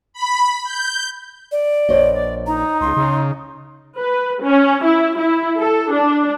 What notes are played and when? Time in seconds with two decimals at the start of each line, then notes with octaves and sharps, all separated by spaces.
0.13 B5
0.64 G6
1.52 D5
1.89 A#1 C5 C#5 D#5
2.13 D5
2.47 D#4 A#5
2.81 C#2 C6
2.97 C#3
3.99 B4
4.44 C#4
4.84 E4
5.19 E4
5.59 A4
5.93 D4